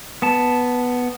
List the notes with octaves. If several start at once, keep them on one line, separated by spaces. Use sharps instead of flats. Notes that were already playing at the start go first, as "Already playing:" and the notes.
B3 A5